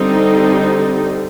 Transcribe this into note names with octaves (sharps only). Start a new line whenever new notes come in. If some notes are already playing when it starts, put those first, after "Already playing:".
Already playing: D3 G3 C4 D#4